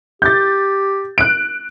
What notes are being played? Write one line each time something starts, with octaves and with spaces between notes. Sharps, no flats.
G4 G6 A6
F#6 D7